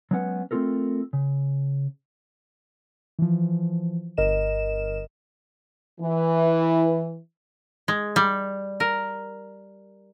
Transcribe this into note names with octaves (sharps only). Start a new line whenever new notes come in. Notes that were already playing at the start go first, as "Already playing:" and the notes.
F#3 G#3 B3 C#4 B4 F#5
A3 C4 C#4 F4 A4 A#4
C#3
E3 F3
G1 A#4 D#5 E7
E3
G#3
G3
A#4